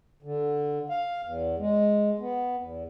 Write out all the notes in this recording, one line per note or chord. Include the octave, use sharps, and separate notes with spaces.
D3
F5
E2
G#3
B3
E2